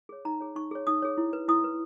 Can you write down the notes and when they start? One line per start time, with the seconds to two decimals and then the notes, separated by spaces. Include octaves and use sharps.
0.09 G#4 C#5
0.25 D#4 A#5
0.40 G#4 C#5
0.55 D#4 C#6
0.71 G#4 C#5
0.87 D#4 D#6
1.02 G#4 C#5
1.18 E4
1.33 B4
1.48 E4 D#6
1.64 B4